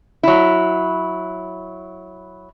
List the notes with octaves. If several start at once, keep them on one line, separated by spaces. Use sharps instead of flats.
F#3 E4